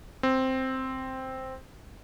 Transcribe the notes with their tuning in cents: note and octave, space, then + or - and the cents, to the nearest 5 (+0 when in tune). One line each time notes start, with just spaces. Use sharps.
C4 +0